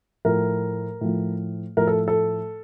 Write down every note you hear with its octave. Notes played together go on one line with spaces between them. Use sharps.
A2 F3 A#4
A2 F3
A2 F3 A#4
A4
A4